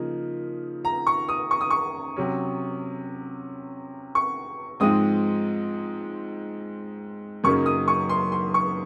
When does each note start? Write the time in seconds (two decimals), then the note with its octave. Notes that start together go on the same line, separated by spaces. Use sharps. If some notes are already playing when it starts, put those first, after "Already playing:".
Already playing: C#3 F3 A#3 D#4
0.85 A#5
1.07 C#6
1.29 D#6
1.51 C#6
1.61 D#6
1.70 C#6
2.16 C3 F#3 C#4
4.15 C#6
4.80 G#2 F3 G#3 C4 D#6
7.44 F#2 C#3 F#3 A#3 D#4 C#6
7.66 D#6
7.88 C#6
8.09 C6
8.32 C6
8.54 C#6